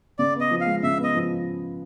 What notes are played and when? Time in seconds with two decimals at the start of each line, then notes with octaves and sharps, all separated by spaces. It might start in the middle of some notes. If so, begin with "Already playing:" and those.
0.19 C#3 D5
0.35 B3
0.41 D#5
0.51 F3
0.61 F5
0.66 G#3
0.83 C#3 E5
0.98 B3
1.04 D#5
1.15 F3